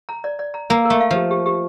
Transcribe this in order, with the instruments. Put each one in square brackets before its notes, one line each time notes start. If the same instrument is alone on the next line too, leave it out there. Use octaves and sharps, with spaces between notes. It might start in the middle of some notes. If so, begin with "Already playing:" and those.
[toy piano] A#5
D5
D5
A#5
[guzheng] A#3 [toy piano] A#4
[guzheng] A3 [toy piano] A#4
[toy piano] F5
[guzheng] F3 [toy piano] G4
[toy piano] G4
G4